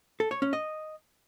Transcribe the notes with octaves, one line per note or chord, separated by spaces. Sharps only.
A4
C#5
C#4
D#5